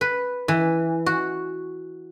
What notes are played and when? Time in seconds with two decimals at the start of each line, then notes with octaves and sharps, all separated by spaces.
0.01 B4
0.48 E3
1.06 F#4